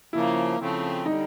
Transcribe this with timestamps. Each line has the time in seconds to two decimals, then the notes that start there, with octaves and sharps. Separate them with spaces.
0.13 C#3 F3 A#3 E4
0.60 C#3 F3 A3 C4
1.06 D3 G3 D#4